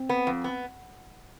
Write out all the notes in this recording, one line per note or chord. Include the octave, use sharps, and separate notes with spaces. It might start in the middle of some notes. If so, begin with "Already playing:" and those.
Already playing: C4
B3
F2
B3